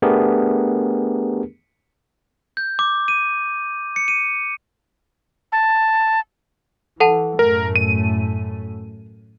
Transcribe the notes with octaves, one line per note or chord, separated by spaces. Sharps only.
A3 B3 D4 G4 G#4 A#4
G6
D6
D#7
C#7
D#7
A5
E3 A4 F#5 A5
F#2 A2 A3 A#4
D#7